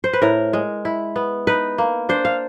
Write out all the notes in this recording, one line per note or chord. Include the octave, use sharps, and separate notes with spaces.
C5
B4
A2 A#4
G#3
E4
B3
D#4 B4
A#3
D4 C5
F5